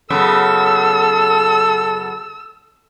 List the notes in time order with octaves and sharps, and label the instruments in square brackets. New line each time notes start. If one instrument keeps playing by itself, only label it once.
[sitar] F#2 C#3 B3 [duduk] A4 [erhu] E6